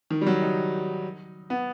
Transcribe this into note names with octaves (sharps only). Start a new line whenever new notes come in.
D#3
G3
F#3
D#4
B3